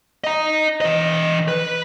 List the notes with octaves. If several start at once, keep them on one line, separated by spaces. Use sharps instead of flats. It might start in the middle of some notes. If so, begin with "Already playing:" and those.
D#5 A#5
E3 D#5
B4